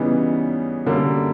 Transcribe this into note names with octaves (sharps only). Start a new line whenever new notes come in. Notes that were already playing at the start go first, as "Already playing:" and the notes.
Already playing: C#3 E3 G3 B3 D#4
F#2 D3 G3 A#3